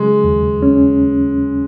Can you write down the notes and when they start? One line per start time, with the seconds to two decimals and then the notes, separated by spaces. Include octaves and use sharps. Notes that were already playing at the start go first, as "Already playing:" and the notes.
Already playing: C#3 F#3 G#3
0.24 D#2
0.62 C#4